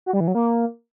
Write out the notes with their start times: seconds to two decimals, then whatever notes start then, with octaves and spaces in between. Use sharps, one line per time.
0.06 F#4
0.13 G3
0.20 E3
0.28 F#3
0.35 A#3